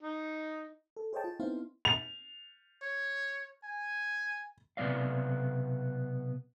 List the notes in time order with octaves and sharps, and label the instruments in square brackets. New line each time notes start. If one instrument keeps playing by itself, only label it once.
[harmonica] D#4
[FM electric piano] A4
G#4 C5 C#5 D#5 G5 A5
F4
B3 C4 D#4 E4 C5 F5
[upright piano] F7
[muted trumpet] C#5
G#5
[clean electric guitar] B1 C3 F3 B3 D5 F5